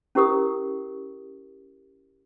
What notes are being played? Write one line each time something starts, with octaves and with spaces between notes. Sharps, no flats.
C#4 E4 G4 A#4 D#6